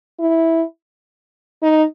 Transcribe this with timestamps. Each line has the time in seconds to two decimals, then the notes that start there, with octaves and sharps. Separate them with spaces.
0.20 E4
1.62 D#4